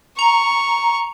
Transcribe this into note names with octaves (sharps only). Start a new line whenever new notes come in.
A#5 C#6